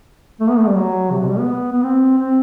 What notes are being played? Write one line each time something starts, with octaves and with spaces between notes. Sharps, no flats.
A3
B3
A3
G3
F#3
C3
B2
G3
B3
B3
C4
C4